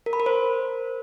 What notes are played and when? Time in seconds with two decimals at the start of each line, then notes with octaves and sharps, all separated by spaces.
0.06 A#4
0.13 B5
0.20 A#4
0.26 C5